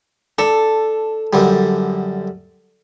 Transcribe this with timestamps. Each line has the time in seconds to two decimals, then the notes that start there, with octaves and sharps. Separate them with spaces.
0.38 D4 A4
1.33 F#2 D3 G3